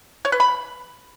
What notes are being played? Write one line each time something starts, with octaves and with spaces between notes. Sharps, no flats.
C#5
B4
B5